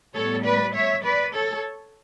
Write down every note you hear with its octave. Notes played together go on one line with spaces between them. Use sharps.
A2 G3 B3 A4 C#5
B4 D5
C#5 E5
B4 D5
A4 C#5